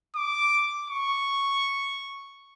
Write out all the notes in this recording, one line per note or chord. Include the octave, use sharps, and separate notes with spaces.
D6
C#6